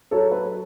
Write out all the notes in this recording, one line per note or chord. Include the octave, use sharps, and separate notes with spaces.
F#3 A4 C#5
B4